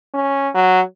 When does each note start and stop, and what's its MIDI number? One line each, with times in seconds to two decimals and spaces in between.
0.14 0.49 61
0.55 0.81 54